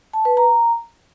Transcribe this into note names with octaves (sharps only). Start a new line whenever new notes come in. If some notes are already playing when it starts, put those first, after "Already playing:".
A5
B4
A#5